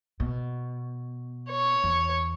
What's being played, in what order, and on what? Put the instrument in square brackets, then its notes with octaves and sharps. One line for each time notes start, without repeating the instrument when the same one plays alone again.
[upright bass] B2
[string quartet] C#5
[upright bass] E2